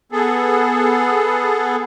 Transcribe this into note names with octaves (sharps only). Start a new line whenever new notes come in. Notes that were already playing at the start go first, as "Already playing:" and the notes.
B3 G#4 A4